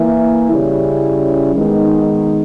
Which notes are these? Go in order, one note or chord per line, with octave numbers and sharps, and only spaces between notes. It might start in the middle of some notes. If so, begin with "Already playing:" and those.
Already playing: E3 A#3 E4
C#3 G3 C#4 E4
D#3 G#3 B3 D#4